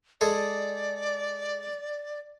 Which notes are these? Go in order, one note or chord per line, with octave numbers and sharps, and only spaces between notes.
G#3 G#4 A4 D5